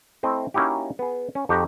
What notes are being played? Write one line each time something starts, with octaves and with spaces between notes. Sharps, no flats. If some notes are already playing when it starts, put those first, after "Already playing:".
A3 C4 E4 D#5
A#3 C#4 D#4 E4 F#4 G4
B3 G#4
C#4
F2 D#4 F#4 G4